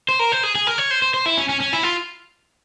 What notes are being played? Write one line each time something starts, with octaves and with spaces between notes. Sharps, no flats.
C5
A#4
C5
G#4
G#4
A#4
C#5
C5
C5
C5
E4
C#4
C#4
C#4
E4
F4